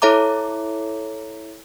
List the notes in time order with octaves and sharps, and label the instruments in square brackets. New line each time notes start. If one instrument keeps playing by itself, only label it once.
[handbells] E4 A4 C#5 E5 A#5 D6